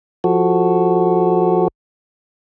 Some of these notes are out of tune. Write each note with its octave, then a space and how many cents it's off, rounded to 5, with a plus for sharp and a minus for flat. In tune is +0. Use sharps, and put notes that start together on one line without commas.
F3 +5 F#4 +0 A4 -5